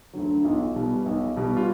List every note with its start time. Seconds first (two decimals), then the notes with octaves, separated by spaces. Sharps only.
0.13 D2 D3 F#3
0.44 B1 F4
0.75 B2 G3
1.06 B1
1.36 B2 G3
1.57 F4